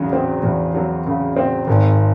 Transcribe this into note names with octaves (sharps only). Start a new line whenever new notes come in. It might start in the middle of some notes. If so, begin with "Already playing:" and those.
Already playing: E2 C#3 F#3
C4
E2
F#3
C#3
C4
G#1